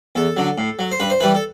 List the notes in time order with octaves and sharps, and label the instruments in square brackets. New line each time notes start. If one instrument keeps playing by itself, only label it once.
[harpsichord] E2 A4
D3 F#3
A2
F#3
C5
G2 B4
C5
E3 G3 B4
A4